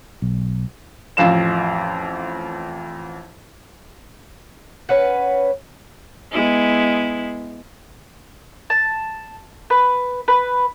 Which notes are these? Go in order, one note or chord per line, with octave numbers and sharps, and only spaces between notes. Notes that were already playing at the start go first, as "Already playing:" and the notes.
B1
A1 F2 F5 E7
C#4 B4 F#5
G#3 B3 E4
A5
B4
B4